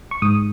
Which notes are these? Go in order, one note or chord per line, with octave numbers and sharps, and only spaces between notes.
C#6
G#2 D#6